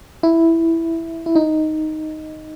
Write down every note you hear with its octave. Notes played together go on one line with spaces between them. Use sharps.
E4
E4
D#4